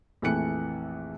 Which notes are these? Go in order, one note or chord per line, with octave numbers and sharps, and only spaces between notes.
A#1 F2 E3 A3 F#6 C#7